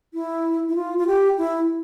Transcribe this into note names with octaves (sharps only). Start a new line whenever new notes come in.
E4
E4
F4
F4
G4
E4